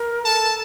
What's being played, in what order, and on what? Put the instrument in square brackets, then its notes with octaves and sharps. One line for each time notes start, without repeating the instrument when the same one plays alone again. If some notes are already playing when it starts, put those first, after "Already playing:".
Already playing: [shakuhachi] A#4
[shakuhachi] A4 [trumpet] A5